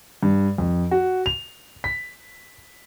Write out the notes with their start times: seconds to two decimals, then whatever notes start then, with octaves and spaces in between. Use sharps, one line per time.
0.23 G2
0.58 F2
0.91 F#4
1.26 F7
1.84 B6